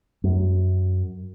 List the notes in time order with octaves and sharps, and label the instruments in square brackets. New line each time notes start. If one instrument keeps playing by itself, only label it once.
[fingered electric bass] F#2